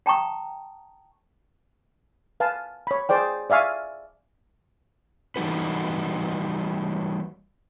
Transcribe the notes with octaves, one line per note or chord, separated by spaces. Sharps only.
G5 A5 A#5 C#6 D#6
B4 F5 G#5 A5
C#5 B5
G#4 C5 D5 G5
D5 E5 F5 G#5 C#6
E3 G3 D#4 F#4 B4